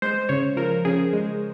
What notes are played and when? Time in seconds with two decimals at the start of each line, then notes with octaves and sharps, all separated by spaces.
0.02 G#3 C5
0.29 C#3 C#5
0.57 F3 A#4
0.85 C#3 G#4
1.13 G#3